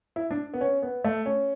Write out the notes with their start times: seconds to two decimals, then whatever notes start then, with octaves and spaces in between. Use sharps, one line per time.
0.16 E4
0.31 D4
0.54 B3
0.61 C#4
0.82 B3
1.04 A3
1.26 C#4